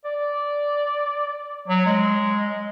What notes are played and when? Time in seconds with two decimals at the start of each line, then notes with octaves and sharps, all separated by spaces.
0.05 D5
1.68 F#3
1.86 G#3